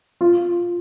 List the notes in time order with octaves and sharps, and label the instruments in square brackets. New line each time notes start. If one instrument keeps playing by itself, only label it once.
[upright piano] F4